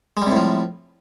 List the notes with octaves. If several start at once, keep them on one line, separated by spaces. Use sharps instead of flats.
A2 C3 F3 G3 G#3